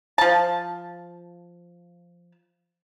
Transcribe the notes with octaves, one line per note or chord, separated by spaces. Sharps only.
F3 A5